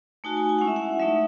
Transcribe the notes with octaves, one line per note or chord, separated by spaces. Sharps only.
A3 D#4 F#4 G#5
G#5
G#5
G#3 C#4 E4 F#5
E5
F#5
F#3 A3 D#4 E5